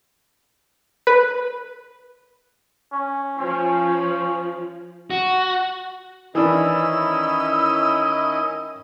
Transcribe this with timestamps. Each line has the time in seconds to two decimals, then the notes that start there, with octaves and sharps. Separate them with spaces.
1.07 B4
2.92 C#4
3.39 F3 C#4
5.11 F#4
6.35 D#3 E3 C#4 D4 E4 D#5 E6